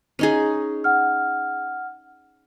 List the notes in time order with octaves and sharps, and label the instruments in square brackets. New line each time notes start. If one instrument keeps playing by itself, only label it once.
[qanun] C#4 D#4 G#4
[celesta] F#5 F6